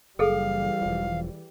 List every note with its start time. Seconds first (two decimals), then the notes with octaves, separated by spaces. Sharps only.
0.19 F#1 E3 G3 G#4 A4 F5
0.82 E1 F3